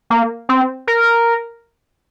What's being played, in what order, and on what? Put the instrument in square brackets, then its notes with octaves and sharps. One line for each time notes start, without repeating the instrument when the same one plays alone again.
[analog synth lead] A#3
C4
A#4